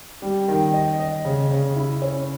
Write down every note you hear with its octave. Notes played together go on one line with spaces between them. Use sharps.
G3
D#3
D#5
D#5
C#3
C#3
E4
C#4